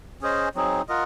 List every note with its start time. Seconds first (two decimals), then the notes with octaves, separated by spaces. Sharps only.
0.22 C#4 G#4 C5 D#5
0.55 F#3 C4 D#4 G#4
0.89 F4 A#4 D#5 F#5